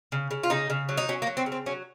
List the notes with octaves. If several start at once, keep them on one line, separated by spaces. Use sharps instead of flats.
C#3
C#3
F4
C#3 D#4
C#3
F#3
D#4
F#3 C#4
A#3
F#3
C4
C#3
C4
F#3 C#4